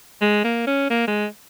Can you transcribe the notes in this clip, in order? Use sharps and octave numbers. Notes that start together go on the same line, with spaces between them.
G#3
A#3
C#4
A#3
G#3